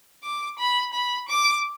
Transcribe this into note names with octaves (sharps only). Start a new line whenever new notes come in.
D6
B5
B5
D6